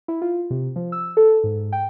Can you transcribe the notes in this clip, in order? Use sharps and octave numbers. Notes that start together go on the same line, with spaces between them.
E4
F4
C3
F3
E6
A4
G#2
G5